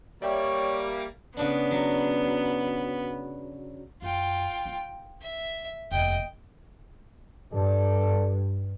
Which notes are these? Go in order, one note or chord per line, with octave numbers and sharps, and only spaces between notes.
G3 A#3 C#5 D5 E5 G5
C#3 B3 D4
F#3
F#2 F4 G5
D#4
E5
F1 D#2 D#5 G5
G2 A4 D5